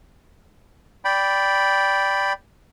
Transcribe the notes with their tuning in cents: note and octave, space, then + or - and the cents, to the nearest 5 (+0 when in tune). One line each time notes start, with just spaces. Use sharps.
D5 -10 G5 +0 B5 +0